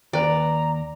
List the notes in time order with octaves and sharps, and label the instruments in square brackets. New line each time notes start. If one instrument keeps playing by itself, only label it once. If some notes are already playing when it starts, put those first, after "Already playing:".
[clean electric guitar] D#2 [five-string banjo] B4 G5 [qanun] D5 [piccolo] A#5